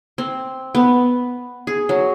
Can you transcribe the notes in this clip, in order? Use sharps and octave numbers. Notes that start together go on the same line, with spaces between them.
C4
B3
G#4
F#3